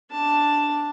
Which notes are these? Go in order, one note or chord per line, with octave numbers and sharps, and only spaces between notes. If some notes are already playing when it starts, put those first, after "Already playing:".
D4 A5